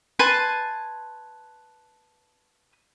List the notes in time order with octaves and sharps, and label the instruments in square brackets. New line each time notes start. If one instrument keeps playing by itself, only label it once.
[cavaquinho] B4 G#5 A5 C6